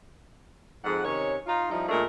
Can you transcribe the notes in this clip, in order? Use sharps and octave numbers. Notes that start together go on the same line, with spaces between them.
F2 G#2 G#3 F#5
C3 D#3 C#4 C#5
D#4 F4
F3 G3 D#4 E4
A#2 G#3 A3 D4 A#4